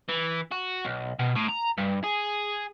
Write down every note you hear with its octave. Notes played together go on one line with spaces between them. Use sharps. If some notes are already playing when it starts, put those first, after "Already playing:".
E3
F#4
B1
B2
A2
A#5
G2
G#4